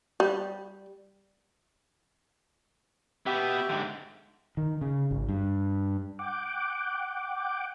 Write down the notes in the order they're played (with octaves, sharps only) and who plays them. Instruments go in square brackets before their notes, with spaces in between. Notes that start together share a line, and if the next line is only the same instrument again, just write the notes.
[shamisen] G3
[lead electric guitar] B2 B3 [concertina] G4 E5
[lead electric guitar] G#2 D3
[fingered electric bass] D#3
C#3
G#1
G2
[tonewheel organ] F#5 G5 D6